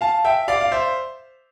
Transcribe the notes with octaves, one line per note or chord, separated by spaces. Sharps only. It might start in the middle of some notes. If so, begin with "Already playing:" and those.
F5 A5
E5 G5
D5 F5
F5
C5 E5